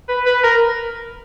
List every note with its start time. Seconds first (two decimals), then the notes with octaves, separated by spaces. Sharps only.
0.09 B4
0.26 B4
0.44 A#4